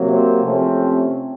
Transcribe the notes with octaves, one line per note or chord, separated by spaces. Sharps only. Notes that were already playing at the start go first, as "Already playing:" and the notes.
Already playing: C3 F#3 A#3
C4
C3 F3 A3 C4 C#4